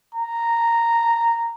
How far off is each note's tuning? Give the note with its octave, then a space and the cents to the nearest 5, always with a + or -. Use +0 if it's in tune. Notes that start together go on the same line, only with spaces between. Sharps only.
A#5 -5